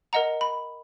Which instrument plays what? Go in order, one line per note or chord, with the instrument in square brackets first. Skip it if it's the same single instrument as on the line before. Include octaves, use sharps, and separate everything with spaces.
[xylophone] A#4 D#5 F#5 A#5
B5